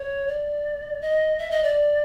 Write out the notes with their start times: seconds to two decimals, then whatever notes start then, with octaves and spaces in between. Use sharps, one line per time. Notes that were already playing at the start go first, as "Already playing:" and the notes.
Already playing: C#5
0.28 D5
1.01 D#5
1.39 E5
1.51 D#5
1.63 D5